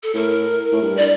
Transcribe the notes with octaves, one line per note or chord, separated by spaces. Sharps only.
A4
A2 A#4
A2
G2
D5